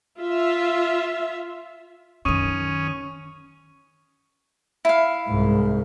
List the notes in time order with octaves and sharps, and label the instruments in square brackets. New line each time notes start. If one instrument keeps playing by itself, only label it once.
[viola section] F4 E5
[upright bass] F#2 D#3 [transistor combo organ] C#4 [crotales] C#6 D#6 D#7
[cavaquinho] E4 F5
[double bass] C2 G#2